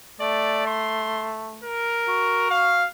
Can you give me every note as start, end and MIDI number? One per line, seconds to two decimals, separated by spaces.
0.21 1.65 57
0.21 0.65 74
0.67 1.34 84
1.64 2.47 70
2.08 2.87 66
2.50 2.85 77